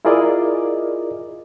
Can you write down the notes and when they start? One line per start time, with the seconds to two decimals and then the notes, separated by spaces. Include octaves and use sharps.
0.05 E4 F4 G#4 A#4 D5 D#5